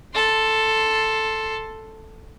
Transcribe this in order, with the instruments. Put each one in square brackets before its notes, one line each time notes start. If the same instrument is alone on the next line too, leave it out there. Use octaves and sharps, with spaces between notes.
[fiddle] A4 C6